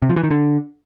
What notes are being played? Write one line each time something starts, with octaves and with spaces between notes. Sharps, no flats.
C3
F3
E3
D#3
D3